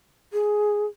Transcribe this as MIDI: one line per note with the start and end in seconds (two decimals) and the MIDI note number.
0.33 0.86 68